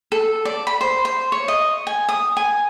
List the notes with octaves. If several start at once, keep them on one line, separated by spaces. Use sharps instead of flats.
A4
D5
B5
C5
C5
C#5
D#5
G#5
D#6
G#5